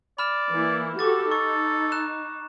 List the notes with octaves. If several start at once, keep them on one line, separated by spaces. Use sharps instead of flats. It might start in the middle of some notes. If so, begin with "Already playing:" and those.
D5 B5 F6 E7
E3 A#3 E4
F#4 G4 A4 C#6 D6 A6
D#4 A4 C#6
A#5 F#6 E7